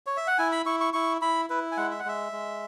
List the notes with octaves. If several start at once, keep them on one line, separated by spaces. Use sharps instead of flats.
C#5
E5
F#5
E4 G#5
B5
E4 C#6
C#6
E4 C#6
E4 B5
E4 B4
G#5
G#3 F#5
E5
F#5
G#3 E5
G#3